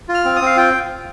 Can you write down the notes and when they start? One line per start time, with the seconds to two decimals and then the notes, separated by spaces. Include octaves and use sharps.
0.09 F4
0.14 F6
0.25 C4
0.36 D#6
0.41 C4 F5
0.57 F4 G5